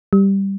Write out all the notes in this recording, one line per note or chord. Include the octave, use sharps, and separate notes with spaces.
G3